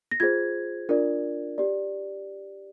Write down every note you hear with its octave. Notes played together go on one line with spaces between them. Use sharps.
A#6
F4 G#4 C5 G#6
D4 F4 A#4 D5
G4 D5